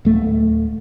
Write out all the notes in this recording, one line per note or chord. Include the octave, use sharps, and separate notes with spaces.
D1 A3